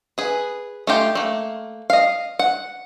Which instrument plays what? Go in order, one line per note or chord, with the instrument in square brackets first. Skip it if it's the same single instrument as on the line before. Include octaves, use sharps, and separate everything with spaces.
[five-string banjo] G#4 B4
A3 D#4 F4 G4
A3 A#3
D#5 F5
F#5